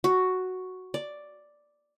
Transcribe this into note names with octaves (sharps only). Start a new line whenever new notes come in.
F#4
D5